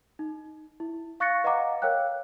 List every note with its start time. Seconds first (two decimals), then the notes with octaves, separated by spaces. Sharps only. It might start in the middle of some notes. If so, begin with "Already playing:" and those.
0.19 D#4
0.80 E4
1.20 F5 C#6 F#6 A6 A#6 C#7
1.44 B4 D#5 F5 F#5 A#5 D6
1.82 A#4 C#5 F5 G5 F#6